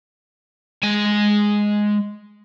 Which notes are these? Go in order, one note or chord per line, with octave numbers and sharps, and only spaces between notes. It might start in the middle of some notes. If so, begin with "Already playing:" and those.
G#3 G#5